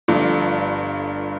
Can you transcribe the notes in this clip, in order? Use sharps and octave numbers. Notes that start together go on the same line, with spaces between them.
G1 G2 F3 A3